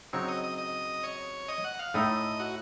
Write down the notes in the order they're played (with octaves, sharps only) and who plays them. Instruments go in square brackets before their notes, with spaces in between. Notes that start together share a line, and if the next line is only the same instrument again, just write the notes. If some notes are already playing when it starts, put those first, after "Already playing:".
[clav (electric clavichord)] C#3 F#3 C4 D#4 [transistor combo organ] C#5
[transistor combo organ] D#5
D#5
D#5
C#5
D#5
F#5
F5
[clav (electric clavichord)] A2 A3 D#4 [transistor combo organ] D#5
[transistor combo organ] F#4